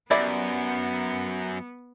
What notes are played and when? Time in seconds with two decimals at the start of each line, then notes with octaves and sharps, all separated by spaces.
0.11 F#2 G3 B3 E4 D5